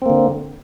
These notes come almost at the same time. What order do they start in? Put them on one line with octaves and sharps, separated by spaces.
C4 A#3 D3